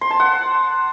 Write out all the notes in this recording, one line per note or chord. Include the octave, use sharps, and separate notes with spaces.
C6
A5
F#5